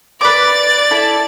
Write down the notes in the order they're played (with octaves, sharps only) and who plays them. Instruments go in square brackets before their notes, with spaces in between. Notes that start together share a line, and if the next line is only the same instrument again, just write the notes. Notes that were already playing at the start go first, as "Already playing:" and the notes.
[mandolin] B4 D6 [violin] D5 A6
[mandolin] E4 A4